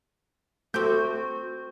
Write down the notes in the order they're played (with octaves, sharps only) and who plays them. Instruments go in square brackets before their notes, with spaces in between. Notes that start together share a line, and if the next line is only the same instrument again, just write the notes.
[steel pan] A3 [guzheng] C4 G4 [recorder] F#4 [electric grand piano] G6